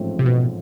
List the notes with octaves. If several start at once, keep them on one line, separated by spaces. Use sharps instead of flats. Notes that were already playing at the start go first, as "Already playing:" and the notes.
Already playing: A1 G#2 F3 A3 C4
C3
B2